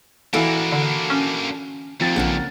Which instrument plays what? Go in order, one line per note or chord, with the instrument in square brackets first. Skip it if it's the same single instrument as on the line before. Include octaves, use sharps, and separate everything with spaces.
[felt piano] E3 E4 F5 [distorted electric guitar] A#3 D4 [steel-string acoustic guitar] F#4 A4
[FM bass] D3
C#4
[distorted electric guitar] D#2 D3 [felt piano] F3 C4 A6
[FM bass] A#1 [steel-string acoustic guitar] C#3 A#3 F#5